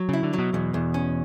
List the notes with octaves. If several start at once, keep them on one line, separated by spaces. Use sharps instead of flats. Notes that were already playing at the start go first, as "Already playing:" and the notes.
Already playing: F#3
C#3 E4
D3
F#3
B2
E2 B2
E2
C#4